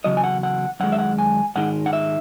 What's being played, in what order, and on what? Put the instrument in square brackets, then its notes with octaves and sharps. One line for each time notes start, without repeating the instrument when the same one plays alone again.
[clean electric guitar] E2 C#3 F#3 D#5
G#5
F#5
F#5
F#2 D#3 G#3 F#5
E5
F#5
G#5
G#2 D#3 G#3 F#5
F#5
E5